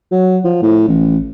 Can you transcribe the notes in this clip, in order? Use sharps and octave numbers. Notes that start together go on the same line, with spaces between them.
F#3
F3
A2
A1